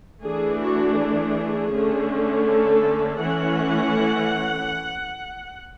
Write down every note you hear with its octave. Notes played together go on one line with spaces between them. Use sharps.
E3 A3 D4 G#4
F#4
G#4
D3 A3 C#4
A4
E3 A3 C#4 F#5